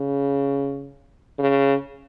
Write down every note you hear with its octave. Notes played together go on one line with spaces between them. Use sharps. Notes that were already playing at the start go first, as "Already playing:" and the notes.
Already playing: C#3
C#3